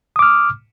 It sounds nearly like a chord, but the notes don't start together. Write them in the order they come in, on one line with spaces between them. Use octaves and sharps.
D#6 D6 F6